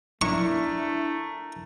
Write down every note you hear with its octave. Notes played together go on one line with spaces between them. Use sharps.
A3 D4 E4 A#4 C#6